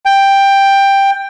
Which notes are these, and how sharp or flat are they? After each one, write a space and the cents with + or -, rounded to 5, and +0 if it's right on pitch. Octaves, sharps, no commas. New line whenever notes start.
G5 +10